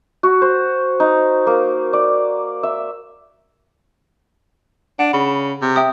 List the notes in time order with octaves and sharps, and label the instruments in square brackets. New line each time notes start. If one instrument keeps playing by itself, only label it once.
[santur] F#4
C5
D#4
A#3
D5
E5
[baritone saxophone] D4 [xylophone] F#5
[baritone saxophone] C#3 [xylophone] B5
[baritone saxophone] C3
[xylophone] E5 G5 D#6